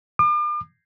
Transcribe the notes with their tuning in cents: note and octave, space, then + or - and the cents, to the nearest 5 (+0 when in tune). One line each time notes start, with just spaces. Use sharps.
D6 +40